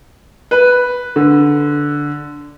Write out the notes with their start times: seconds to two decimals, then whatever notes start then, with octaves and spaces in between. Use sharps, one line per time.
0.51 B4
1.16 D3